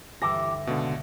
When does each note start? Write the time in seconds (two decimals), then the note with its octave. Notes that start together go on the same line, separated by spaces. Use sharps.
0.22 D2 G2 E3 E4 G4 A#6
0.67 C#2 B2 D3